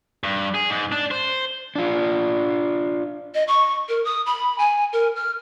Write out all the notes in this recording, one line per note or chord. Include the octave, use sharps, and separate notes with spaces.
G2
G#4
G#2
D4
C5
D4 F4
D#5
C#6
A#4
D#6
B5
G#5
A#4
F6